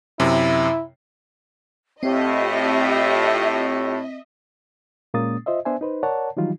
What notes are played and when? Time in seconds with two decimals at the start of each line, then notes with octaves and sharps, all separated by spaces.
0.20 F#2 C3 E4
2.03 A2 C4 F4 G4 D#5 E5
5.14 A#2 G#3 A#3 C#4 D#6 A6
5.46 F4 C5 D#5 E5
5.65 B3 D4 C5 E5 G#5
5.81 D#4 B4 C5
6.03 A#4 C#5 D5 F#5 A5
6.37 D#3 E3 F#3 G3 D#4 F4